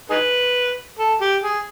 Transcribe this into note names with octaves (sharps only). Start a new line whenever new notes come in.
D#4 G#4 B4
A4
G4
G#4